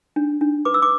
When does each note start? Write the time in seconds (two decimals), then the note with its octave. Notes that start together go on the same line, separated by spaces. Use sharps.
0.16 D4
0.41 D4
0.65 B4 D6
0.74 E6
0.82 D6